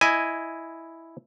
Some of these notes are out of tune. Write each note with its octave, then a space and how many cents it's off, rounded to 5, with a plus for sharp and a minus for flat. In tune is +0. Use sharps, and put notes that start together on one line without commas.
E4 +0 D#5 +0 G#5 +0